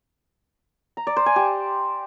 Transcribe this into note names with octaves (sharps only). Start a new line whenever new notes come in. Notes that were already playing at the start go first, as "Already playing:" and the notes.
A#5
D5
C5
G#5
G4